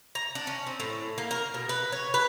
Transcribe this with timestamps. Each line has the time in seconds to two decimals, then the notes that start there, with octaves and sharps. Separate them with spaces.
0.15 A#5
0.35 D4
0.47 C#4
0.67 C4
0.80 A2
1.18 A#3
1.31 A#4
1.54 B2
1.69 B4
1.92 C#5
2.14 B4